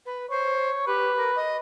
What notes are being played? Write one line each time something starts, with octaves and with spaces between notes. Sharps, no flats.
B4
C5 C#5
G4 B4
A#4
D#5